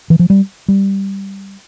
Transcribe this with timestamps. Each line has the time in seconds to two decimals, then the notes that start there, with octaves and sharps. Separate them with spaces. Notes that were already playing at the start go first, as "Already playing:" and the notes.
0.10 E3
0.19 F3
0.30 G3
0.68 G3